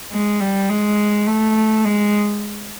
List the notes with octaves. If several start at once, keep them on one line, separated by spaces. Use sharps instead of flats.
G#3
G3
G#3
A3
G#3